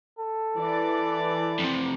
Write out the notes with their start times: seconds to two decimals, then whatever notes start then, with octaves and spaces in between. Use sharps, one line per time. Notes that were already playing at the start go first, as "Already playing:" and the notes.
0.19 A4
0.57 E3 D5
1.59 F2 C3